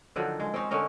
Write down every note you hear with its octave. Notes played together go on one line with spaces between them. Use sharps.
D3 D#3 F3 F#3
G#3
C4 C#4 D#4
D3 C#4 D#4 A#4